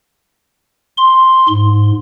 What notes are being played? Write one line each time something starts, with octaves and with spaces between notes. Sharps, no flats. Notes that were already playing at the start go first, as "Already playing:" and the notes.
C6
G#2